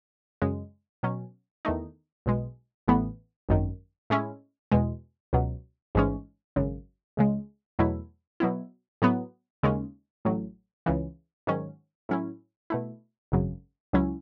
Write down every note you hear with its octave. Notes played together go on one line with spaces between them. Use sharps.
F#2 C#3 G#3
B2 F#3 C#4
E2 D#3 A3 D#4
B1 B2 G#3
A1 A2 E3 B3
G#1 F#2 D#3
A2 G#3 C#4 E4
E2 B2 G#3
C#2 B2 F#3
A1 G#2 E3 G#3 C#4
G#1 F#2 C#3
C#2 C#3 G#3
E2 B2 F#3 A3 E4
B2 F#3 B3 E4
A2 F#3 B3
D#2 C#3 G#3 C#4
A1 A2 F#3
C#2 C#3 E3
G#2 D#3 F#3 C#4
A2 F#3 C#4 E4
B2 A3 E4
G#1 F#2 C#3 F#3
C#2 C#3 F#3 C#4 E4